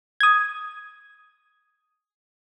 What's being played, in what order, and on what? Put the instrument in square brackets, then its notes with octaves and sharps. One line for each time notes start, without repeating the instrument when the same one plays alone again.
[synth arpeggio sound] D#6 G#6